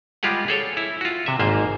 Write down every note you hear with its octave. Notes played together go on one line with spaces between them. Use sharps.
G3 G#3 F4 G4 G#4 F#5
G#4 A4 C#5
E4
F4 F#4
C3 E5
G#1 G#2 A#3 C5